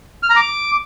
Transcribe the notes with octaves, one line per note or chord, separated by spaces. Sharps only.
F6
A#5
D6